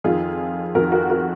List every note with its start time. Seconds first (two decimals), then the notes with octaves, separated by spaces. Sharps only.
0.04 F2 D#3 F4 G#4
0.75 F2 F#4 A#4
0.78 D#3
0.92 F#4 A#4
1.10 F#4 A#4